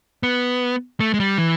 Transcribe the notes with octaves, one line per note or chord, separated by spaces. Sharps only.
B3
A3
G#3
G3
E3